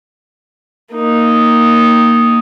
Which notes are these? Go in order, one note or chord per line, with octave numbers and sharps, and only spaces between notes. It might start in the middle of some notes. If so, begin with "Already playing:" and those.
A#3 D#4